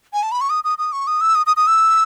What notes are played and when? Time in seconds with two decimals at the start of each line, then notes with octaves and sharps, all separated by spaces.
0.13 G#5
0.23 A5
0.32 B5
0.41 C#6
0.50 D#6
0.64 D#6
0.78 D#6
0.92 C#6
1.07 D#6
1.21 E6
1.35 D#6
1.46 D#6
1.57 D#6
1.67 E6